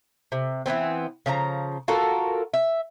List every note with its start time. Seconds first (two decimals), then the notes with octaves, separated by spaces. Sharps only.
0.32 C3
0.66 E3 F#3 B3 C4
1.26 C#3 F3 F4 A#5
1.88 F4 F#4 A4 A#4
2.54 E5